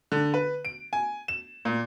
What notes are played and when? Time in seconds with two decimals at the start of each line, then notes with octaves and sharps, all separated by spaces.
0.12 D3
0.34 B4
0.65 D7
0.93 G#5
1.28 E7
1.65 A#2